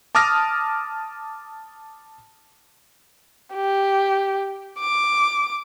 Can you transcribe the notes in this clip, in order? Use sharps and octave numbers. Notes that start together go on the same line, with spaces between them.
A5 D6 D#6 F6 A#6
G4
D6